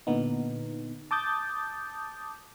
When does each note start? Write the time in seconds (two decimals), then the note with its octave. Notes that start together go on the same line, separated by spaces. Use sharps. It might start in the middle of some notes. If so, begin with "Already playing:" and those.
0.07 A#2 D3 B3 D#4
1.11 A5 D6 D#6 G6 A6